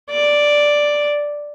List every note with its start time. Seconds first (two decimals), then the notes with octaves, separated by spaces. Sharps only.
0.10 D5